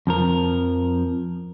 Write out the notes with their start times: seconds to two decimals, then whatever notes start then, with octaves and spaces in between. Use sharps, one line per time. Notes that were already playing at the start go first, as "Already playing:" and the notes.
0.07 F2 F3 A#4